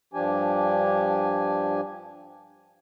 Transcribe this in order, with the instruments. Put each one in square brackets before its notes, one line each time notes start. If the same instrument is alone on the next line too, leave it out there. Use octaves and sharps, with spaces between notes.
[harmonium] G2 F3 D4 G4 G#5